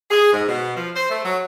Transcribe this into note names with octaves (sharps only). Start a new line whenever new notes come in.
G#4
G#2
B2
F3
C5
A3
F#3